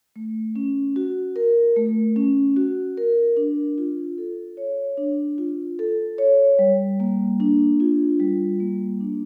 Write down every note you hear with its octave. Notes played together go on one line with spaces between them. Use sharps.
A3
C#4
F#4
A#4
A3
C#4
F#4
A#4
D4
F4
A4
C#5
D4
F4
A4
C#5
G3
A#3
D4
F4
G3
A#3
D4